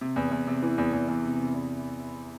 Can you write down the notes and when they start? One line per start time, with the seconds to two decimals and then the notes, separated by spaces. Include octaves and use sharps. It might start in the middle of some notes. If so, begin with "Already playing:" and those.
0.01 C3
0.16 E2
0.31 E2
0.47 C3
0.62 E3
0.78 E2
0.93 E2
1.08 E2
1.24 C3
1.40 C3
1.54 E2